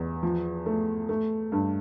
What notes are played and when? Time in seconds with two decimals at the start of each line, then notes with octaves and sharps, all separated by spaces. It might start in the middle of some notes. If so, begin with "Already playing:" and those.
Already playing: E2
0.23 F3
0.66 A3
1.09 A3
1.52 G2